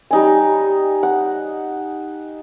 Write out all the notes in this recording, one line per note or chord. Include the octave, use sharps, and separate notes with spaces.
G3 D#4 G#5
F#5